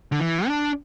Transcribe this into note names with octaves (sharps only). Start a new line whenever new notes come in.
D3
E3
D4